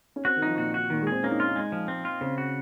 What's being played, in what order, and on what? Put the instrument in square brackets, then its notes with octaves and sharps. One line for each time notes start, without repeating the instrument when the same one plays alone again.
[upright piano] C#4
[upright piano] C4 [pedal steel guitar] F#4
[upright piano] D#3
[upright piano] F3 [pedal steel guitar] D#4
[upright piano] A#2 [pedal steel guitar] F#4
[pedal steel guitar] F#4
[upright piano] A#2 [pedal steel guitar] D#3
[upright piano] G#3
[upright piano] C4 [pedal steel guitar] G#4
[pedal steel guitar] A#3 [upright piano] C#4
[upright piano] D#4
[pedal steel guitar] F4
[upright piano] D#4
[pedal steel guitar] G#3
F3
C4
F4
[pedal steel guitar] C#3 [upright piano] C4
[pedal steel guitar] F#4